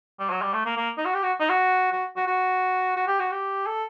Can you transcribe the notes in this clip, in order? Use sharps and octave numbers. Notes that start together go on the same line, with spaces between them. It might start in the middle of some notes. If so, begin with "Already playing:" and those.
G3
F#3
G3
A3
A#3
A#3
D#4
F#4
G4
F#4
D#4
F#4
F#4
F#4
F#4
F#4
G4
F#4
G4
A4